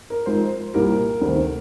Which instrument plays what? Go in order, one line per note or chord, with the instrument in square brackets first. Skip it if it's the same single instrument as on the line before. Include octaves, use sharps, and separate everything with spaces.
[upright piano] A#4
G#1 G#2 F3 C4 C5
C2 A#2 G3 A#4
D2 C3 D#3